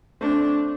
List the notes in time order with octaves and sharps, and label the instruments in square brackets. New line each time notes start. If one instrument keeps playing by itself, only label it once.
[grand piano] A3 C4 [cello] D4